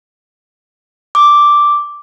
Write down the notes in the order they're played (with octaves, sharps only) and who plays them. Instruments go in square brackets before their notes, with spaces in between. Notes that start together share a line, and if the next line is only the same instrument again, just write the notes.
[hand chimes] D6